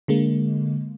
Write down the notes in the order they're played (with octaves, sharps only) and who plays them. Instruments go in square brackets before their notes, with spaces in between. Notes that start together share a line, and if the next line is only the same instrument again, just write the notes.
[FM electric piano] D3 G#3 A#3